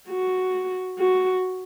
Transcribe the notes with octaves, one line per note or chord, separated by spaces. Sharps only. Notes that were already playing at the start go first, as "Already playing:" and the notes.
F#4
F#4